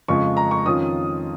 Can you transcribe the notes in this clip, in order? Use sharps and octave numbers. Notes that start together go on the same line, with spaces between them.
F2 C#3 G#3 F4 C#6
A#5
C#6
F2 D#3 C#4 F4 D#6